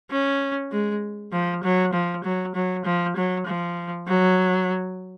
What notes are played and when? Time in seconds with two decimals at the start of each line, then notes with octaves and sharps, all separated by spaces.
0.10 C#4
0.72 G#3
1.32 F3
1.64 F#3
1.93 F3
2.24 F#3
2.55 F#3
2.85 F3
3.16 F#3
3.47 F3
4.07 F#3